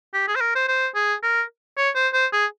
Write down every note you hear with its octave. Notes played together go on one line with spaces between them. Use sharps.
G4
G#4
C5
A#4
C5
C5
G#4
A#4
C#5
C5
C5
G#4